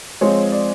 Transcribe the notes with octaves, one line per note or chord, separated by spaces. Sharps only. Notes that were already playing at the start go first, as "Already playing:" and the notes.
F3 G#3 C4 C#5
D5